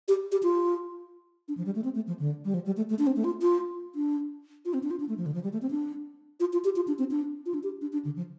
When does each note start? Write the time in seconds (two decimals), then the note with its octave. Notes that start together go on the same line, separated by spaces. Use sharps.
0.08 G4
0.32 G4
0.43 F4
1.48 D4
1.57 F3
1.66 G3
1.75 A3
1.84 C4
1.95 A3
2.07 F3
2.19 D3
2.45 G3
2.54 F3
2.66 G3
2.77 A3
2.89 A3
2.99 D4
3.07 C4
3.16 A3
3.24 F4
3.42 F4
3.95 D4
4.65 F4
4.74 C4
4.83 D4
4.91 F4
5.00 D4
5.09 A3
5.18 F3
5.26 D3
5.34 F3
5.44 G3
5.53 A3
5.62 C4
5.71 D4
6.40 F4
6.53 F4
6.64 G4
6.76 F4
6.88 D4
6.99 C4
7.11 D4
7.46 F4
7.54 D4
7.63 G4
7.81 D4
7.93 D4
8.05 D3
8.16 F3